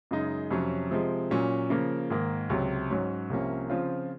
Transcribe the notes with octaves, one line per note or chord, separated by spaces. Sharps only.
F#2 C#3 G#3 D#4
F2 C3 F#3 C#4
C3 F3 G#3
A#2 F#3 C#4
C#3 F3 A#3
G#2 D#3 A#3
C#2 C3 F#3
G#2 F#3 C#4
C2 C3 F3 A#3 C#4
C#3 F3 C4 F4